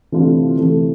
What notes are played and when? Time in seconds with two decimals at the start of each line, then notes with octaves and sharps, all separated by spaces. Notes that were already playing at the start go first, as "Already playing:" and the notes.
0.12 C3 E3 A3 D4 F4
0.58 C3 E3 A3